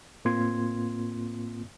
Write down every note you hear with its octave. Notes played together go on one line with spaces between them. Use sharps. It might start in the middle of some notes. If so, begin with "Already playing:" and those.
A2 A#3 C4 F4 C6 G#6